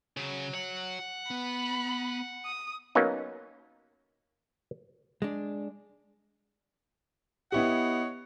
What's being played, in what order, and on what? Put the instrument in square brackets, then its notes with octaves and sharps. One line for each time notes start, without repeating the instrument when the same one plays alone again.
[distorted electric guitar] C#3 [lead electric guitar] F#4 C#5
[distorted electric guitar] F#5
[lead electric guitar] B3 [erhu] B5
[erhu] D#6
[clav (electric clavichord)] F#3 A#3 B3 C#4 D#4
[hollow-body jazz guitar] G#3 D4
[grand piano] B3 E4 G4 [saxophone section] C#5 D#5 F#5